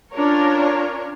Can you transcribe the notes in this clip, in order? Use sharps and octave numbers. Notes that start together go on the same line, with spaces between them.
C#4 D4 F4 A#4 C#5